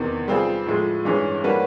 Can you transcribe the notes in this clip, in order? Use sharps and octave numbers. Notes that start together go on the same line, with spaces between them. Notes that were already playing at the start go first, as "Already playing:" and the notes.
Already playing: E2 C3 D#3
G3 C4 F4 G#4
A2 F3 G#3
G2 E3 G#3 C#4
G3 A#3 C#4 F#4 B4